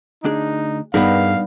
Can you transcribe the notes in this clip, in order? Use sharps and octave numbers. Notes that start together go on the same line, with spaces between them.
D2 D4 D#4 G#4
G2 B3 D#4 G#4 A#4 F5